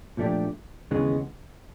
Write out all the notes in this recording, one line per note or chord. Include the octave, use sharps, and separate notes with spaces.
A#2 F3 A3 D4 G4
D#2 C#3 E3 G#3 B3